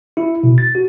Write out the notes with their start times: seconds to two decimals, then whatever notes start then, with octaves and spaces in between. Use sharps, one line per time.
0.17 E4
0.43 B2
0.58 A6
0.75 F#4